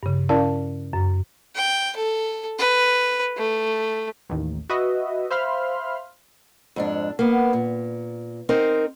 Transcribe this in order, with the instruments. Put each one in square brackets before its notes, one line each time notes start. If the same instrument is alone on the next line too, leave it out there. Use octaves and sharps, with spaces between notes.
[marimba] G2 C#3
C#4 E4 A#4 D5 F5 A5
F#2
[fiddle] G5
A4
B4
A3
[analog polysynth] A1 D#2
F#4 B4 D#5 E5
C5 E5 F5 B5 C6 F6
[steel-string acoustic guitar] F2 G#2 D4
A#3 B3
A#2
C4 D#4 A#4 C5